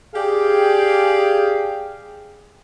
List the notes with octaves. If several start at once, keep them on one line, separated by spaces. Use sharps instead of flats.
G4 G#4 D5 F5 G5